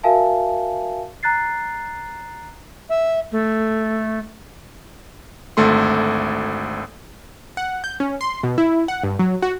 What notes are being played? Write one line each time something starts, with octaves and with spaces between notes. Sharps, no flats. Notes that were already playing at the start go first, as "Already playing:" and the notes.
F#4 A#4 E5 F5 G#5 A5
A#5 F#6 A6 C7
E5
A3
G#1 D2 A3 C6
F#5
G6
C#4
C6
B2
E4
F#5
G2
F#3
F#4